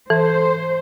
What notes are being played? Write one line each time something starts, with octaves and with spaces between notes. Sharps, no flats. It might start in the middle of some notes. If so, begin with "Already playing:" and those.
E3 A4 C5